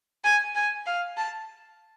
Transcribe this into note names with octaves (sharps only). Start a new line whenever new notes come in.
G#5
G#5
F5
A5